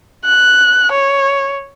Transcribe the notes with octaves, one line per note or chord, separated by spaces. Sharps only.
F#6
C#5